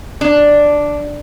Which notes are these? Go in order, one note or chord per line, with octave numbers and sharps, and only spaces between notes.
D4